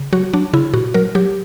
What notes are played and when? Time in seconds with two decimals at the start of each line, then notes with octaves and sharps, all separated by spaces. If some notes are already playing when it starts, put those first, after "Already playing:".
Already playing: C#3
0.13 F#3 F#4
0.33 F#3 D4
0.53 C#3 E4
0.74 A#2 F#4
0.94 F#3 A#4
1.15 F#3 G4